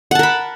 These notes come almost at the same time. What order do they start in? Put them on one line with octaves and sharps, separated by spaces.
F#5 A5 A#4 B5